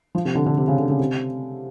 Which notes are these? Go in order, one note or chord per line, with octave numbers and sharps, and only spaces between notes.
F3
C3
D3
D3
C3
C#3
D3
C#3
C3